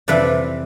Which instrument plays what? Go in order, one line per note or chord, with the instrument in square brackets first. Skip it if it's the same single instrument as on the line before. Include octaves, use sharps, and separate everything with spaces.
[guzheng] F2 C3 E3 G3 B4 D5